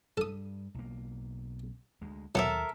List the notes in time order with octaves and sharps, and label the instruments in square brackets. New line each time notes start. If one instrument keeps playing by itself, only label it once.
[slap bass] G2 G3 [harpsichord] A4 D#6
[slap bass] B1 A#3
D2 G#3
[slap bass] D#2 [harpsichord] B2 F#3 [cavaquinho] A4 A#4 E5